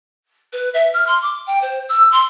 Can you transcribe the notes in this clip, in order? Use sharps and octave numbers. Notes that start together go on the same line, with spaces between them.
B4
E5
F6
C6
D6
G5
C5
E6
C6